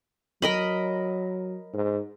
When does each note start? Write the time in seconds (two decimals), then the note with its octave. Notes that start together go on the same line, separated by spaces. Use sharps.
0.42 F#3 A#4 D#5 B5
1.73 G#2